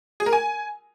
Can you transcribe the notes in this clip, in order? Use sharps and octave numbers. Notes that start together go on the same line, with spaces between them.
G#4
A#4
G#5